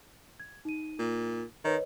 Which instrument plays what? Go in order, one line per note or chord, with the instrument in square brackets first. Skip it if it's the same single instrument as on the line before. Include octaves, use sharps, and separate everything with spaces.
[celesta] G#6
D#4 D#7
[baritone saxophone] A#2
[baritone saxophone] D#3 [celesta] B4 C#5 D#5